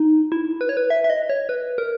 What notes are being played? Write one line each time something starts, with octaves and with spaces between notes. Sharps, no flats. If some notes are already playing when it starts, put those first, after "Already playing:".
Already playing: D#4
E4
B4
C#5
B4
E5
E5
D#5
C#5
B4
A#4